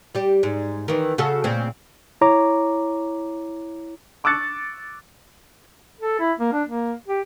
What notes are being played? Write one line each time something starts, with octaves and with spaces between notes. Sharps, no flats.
G3 G4
G#2
D#3 E3
C#3 F#4 A4
A#2 C#3 C4
E4 C#5 A#5 D6
C#6 D6 E6 F#6 A6 C#7
A4
E4
A#3
D4
A#3
G4